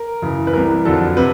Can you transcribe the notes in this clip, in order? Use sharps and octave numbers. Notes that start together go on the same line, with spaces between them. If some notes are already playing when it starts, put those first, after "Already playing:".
Already playing: A#4
F#2 C#3 E3
B4
C2 C3 E3 A#4
F2 D3 F#3 A4
C3 B4